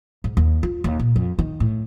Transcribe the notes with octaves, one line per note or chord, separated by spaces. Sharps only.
G#2
D#2
F4
D#2
A#2
F2
D#3
A2